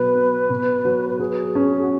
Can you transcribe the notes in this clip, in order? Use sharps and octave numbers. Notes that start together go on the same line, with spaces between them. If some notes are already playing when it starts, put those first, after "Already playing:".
Already playing: B2 F#3 B4
B3
B2
F#3
B4
F#3 G#4
C#4
F#4